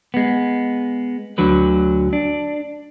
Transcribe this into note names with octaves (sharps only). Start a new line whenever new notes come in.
G#3 B3
D2 D3 F#3 B4
D4